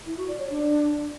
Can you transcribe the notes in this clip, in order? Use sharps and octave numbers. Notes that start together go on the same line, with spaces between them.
E4
F#4
D5
C#5
D4